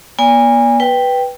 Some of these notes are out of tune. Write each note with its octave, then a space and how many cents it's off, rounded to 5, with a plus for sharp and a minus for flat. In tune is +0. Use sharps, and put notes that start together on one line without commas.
B3 -45 D5 -35 G#5 -25
B4 +0 G5 +0